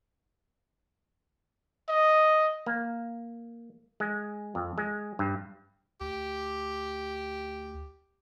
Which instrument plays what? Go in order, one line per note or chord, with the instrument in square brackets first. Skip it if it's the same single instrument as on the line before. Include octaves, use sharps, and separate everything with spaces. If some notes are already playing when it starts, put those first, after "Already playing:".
[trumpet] D#5
[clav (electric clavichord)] A#3
G#3
F2
G#3
G2
[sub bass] D2 [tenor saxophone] G4